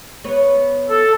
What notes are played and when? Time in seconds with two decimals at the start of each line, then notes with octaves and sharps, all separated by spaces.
0.24 B3 C#4 C#5
0.90 A4